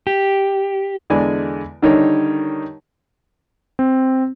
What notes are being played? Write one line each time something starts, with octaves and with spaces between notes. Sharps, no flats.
G4
E2 D3 G#3 D5 G#5 B5
D3 D#3 G3 D#4 A#4 C#5
C4